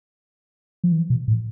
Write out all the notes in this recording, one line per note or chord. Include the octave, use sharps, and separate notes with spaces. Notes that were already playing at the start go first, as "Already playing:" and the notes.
F3
E3
B2
A2